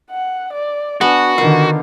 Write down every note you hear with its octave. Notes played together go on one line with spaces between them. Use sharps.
F#5
D5
B3 D4 F#4 G#5
D3 D#3 F4 A#4